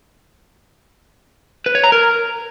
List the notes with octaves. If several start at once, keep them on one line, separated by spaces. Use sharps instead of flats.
B4
C#5
A#5
A#4